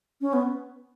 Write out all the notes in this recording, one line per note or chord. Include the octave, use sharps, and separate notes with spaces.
C#4
B3